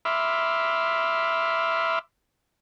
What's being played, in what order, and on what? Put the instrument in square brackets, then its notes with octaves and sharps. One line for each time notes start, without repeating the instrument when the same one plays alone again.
[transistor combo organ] E5 B5 C6 D6 E6 F6